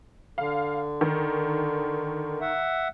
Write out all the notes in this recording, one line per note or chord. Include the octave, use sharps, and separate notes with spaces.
D3 F5
D#3
E5 F#5